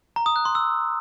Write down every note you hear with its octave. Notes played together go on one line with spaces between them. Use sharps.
A#5
D#6
F#6
C6
E6